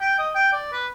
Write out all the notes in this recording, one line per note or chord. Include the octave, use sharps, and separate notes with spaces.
G5
D#5
G5
D5
B4